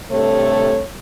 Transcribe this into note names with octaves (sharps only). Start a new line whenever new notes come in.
G2 C3 A3 A4 C#5